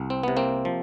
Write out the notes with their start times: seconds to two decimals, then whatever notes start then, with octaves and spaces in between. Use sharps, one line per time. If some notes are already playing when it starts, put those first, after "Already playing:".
Already playing: C2
0.10 C4
0.23 C3 B3
0.37 A#3 C4
0.65 F3